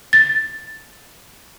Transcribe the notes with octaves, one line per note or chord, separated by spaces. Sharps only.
A6